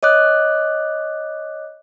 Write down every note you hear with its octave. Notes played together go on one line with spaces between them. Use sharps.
C#5 D#5 D6 F#6